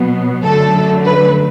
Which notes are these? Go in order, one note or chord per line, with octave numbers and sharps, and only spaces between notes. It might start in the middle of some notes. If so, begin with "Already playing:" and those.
Already playing: B2 F#3 B3
F#2 D3 F#3 A3 A4
B4